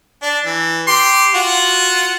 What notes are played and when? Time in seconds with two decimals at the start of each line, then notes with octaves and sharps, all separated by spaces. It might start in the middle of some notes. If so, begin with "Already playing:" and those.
0.23 D4
0.45 E3
0.87 G4 C6
1.35 F4 F#4 F#5